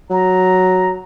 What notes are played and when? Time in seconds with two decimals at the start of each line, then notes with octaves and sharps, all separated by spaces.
0.10 F#3 A#5